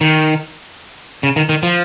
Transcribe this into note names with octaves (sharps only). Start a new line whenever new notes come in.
D#3
C#3
D#3
D#3
F3